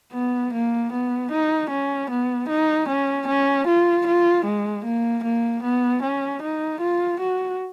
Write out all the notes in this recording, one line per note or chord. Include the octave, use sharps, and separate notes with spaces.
B3
A#3
B3
D#4
C#4
B3
D#4
C#4
C#4
F4
F4
G#3
A#3
A#3
B3
C#4
D#4
F4
F#4